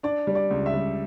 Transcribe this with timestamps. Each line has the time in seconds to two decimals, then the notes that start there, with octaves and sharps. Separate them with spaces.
0.03 D4 D5
0.27 G3
0.35 D5
0.50 C#2
0.66 E5
0.73 G3